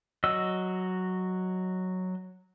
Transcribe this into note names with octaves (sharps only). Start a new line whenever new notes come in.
F#3 F#4 D#5 E6